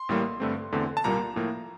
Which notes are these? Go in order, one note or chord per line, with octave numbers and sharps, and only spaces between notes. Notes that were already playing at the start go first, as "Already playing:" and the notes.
Already playing: C6
A1 A2 G3 A#3
G2 D3 A3 C4
E2 D3 A3 C4
A5
C2 A#2 G3 A#3 A#5
A2 F3 A#3